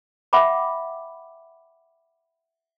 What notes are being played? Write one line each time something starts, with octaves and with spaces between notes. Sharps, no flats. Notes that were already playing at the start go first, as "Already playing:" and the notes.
E5 F#5 G5 B5 D6